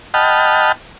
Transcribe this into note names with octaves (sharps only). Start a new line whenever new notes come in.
D#5 F#5 G5 A5 B5 F6